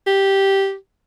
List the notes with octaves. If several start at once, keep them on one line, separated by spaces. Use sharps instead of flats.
G4